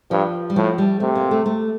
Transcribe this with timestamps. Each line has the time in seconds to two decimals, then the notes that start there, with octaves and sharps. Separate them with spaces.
0.11 G2 F3
0.50 G3
0.56 A2 F3
0.78 G3
1.00 C3 A3
1.15 A#3
1.31 A3
1.46 A3